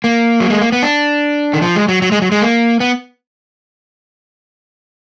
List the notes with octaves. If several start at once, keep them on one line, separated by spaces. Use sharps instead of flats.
A#3
F#3
G#3
A#3
B3
D4
D#3
F3
G#3
F#3
F#3
G#3
F#3
G#3
A#3
B3